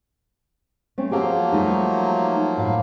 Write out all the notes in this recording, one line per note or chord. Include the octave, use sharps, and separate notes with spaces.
A3 C4 C#4
F3 F#3 A#3 G4 G#4 F5
G3 A3 D#4
A2 F5